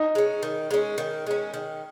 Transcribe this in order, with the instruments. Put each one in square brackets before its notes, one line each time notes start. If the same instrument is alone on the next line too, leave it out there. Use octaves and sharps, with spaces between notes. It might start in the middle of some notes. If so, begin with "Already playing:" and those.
Already playing: [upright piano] D#4
[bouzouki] G#3 C#4
D#3
G#3 C#4
D#3
G#3 C#4
D#3